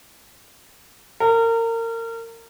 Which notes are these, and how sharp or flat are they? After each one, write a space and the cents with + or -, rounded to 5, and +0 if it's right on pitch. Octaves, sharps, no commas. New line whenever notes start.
A#4 -30